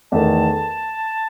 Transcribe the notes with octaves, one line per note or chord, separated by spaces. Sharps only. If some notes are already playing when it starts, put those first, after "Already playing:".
E2 D#3 A3 A5